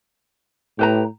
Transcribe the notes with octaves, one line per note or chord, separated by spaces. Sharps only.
A2 G4 B4 A#5